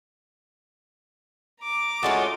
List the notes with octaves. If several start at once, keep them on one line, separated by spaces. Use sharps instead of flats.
A#5 D6
G#3 A3 C#4 F4 F#4 D#6